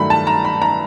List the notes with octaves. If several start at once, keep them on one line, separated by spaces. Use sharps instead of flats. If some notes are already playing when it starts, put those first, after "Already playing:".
Already playing: G2 D#3 F#3 A3 B5
A5
A#5
B5
A#5